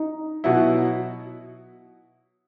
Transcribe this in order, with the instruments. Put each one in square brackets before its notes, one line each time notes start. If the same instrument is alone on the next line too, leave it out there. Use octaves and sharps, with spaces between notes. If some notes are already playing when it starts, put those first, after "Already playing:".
Already playing: [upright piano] D#4
[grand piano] B2 F#3 B3 E4